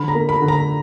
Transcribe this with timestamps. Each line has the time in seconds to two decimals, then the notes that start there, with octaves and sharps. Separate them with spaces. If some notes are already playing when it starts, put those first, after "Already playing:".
Already playing: D3 B5
0.08 A#5
0.15 A#3
0.29 B5
0.42 D3
0.48 A#5